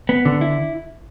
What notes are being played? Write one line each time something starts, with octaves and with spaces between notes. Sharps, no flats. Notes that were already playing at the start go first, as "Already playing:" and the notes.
B3
D3
E4